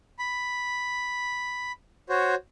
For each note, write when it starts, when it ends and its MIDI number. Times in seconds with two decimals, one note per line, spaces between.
0.19 1.72 83
2.09 2.35 66
2.09 2.35 72
2.09 2.35 73